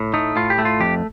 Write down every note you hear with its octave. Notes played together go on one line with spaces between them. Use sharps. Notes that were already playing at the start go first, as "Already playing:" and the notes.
Already playing: A2
A3 D#4
A2 F4
G4
A3
F4
F2 G4